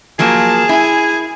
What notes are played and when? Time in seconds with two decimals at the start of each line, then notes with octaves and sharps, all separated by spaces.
0.19 F3 F#3 A#3 G#4 A5
0.69 E4 G#5